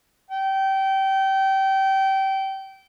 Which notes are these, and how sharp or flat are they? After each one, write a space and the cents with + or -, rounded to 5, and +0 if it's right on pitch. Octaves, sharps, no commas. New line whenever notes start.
G5 -25